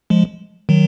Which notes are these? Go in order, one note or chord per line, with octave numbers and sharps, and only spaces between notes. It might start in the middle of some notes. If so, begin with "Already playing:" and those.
F3 G#3
D#3 F#3